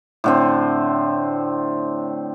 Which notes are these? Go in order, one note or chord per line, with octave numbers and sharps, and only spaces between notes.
A2 D3 C4